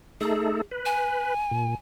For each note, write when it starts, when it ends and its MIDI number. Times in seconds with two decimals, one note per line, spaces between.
0.21 0.61 57
0.21 0.61 63
0.21 0.61 68
0.21 0.61 69
0.71 1.34 71
0.85 1.74 80
1.51 1.75 46